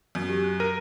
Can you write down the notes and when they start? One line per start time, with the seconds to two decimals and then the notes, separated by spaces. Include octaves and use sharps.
0.15 F#2
0.29 G4
0.44 F#6
0.60 A#4 D#7